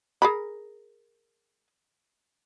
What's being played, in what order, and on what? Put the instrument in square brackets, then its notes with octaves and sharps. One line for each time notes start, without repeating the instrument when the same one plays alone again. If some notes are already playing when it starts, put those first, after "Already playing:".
[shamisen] G#4 A#4 B5